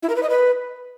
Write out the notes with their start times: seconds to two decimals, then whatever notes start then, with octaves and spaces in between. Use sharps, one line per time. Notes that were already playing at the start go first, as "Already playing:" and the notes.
0.03 E4
0.09 A#4
0.16 B4
0.23 D#5
0.30 B4